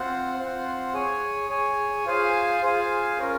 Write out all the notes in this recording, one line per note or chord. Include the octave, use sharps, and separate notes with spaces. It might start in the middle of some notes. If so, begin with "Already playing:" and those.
Already playing: C4 F4 C5 F#5
C4 F4 C5 F#5
G#4 C#5 G#5
G#4 C#5 G#5
F4 G#4 C5 F5 G#5
F4 G#4 C5 F5 G#5
C#4 F4 A#4